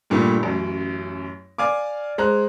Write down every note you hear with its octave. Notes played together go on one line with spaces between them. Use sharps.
G2 A#2 D3 G3 A3
A1 F#2
D5 F5 G#5 D6
G#3 C5 A#5 F#6